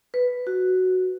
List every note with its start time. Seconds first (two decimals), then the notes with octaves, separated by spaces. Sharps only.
0.14 B4
0.47 F#4